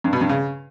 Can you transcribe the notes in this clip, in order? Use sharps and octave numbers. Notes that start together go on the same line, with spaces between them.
G2
B2
G2
C#3